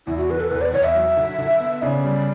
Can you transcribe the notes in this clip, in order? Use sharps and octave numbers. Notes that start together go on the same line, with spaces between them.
E2 E4
F#4
E3 B4
A4
E2 B4
D5
E2 C#5
E5
F#3
D3
D3
B3
E5
C#3 D5
G3